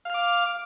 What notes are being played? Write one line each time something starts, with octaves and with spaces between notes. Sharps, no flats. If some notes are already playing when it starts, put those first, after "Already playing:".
F5 D6 F6